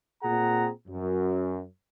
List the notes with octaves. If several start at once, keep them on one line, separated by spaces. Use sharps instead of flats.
A#2 C4 G#4 F#5 A#5
F#2